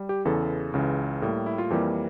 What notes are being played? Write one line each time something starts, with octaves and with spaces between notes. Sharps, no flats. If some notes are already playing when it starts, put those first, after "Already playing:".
Already playing: G3
G4
E2 C#3 E3 A4
C#2 C#3 E3
A2 G3 A#3
E4
F4
F2 E3 G3 A#3 G4